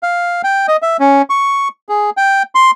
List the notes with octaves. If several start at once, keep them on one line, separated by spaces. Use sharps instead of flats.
F5
G5
D#5
E5
C#4
C#6
G#4
G5
C6